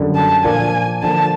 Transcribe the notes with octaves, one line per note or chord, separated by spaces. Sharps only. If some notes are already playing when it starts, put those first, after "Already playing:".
Already playing: F#2 D3 G3
A5
A#2 F3 A#3 D4 G#5
D3 F3 A#3 A5